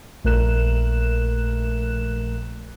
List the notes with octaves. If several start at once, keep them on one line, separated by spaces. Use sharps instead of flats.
A#1 A3 A#4 F#6 E7